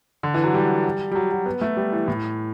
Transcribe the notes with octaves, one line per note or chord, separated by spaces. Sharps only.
D3
E3
F#3
G3
G3
F#3
F#3
B3
A3
G3
E3
A2